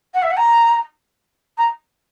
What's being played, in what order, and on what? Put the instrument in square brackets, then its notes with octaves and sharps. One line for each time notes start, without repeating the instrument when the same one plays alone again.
[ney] F#5
E5
F#5
A#5
A#5